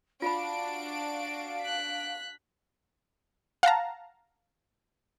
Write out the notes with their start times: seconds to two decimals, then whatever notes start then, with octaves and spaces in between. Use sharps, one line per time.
0.22 D4 F4 F#4 F5 B5 D7
1.61 F#6 B6
3.63 F5 F#5 A5 A#5